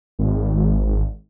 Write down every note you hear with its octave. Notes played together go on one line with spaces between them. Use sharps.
G#1